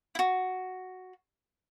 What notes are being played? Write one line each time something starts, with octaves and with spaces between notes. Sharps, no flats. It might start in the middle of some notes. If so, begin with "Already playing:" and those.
E4 F#4